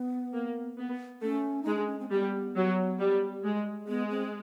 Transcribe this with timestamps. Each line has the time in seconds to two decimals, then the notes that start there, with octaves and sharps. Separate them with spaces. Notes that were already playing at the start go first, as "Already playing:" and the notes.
Already playing: B3
0.34 A#3
0.78 B3
1.22 A3 C#4
1.63 G#3 D#4
1.75 D4
1.86 C#4
2.00 C4
2.11 G3 B3
2.56 F#3
3.00 G3
3.44 G#3
3.88 G#3 B3
4.10 C4